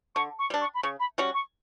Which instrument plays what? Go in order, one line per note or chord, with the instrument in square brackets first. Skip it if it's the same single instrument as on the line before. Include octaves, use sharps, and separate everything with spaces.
[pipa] D3 [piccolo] C#6
[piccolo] C#6
[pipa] G3 D4
[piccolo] C#6
B5
[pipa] C#3 [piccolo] C#6
[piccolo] B5
[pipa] G3 C#4 F#4
[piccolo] C#6